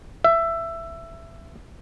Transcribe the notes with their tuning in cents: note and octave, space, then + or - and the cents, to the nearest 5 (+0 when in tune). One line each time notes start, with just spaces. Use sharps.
E5 +15